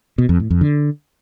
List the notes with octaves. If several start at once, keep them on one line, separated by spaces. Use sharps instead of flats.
B2
F2
A2
F2
D3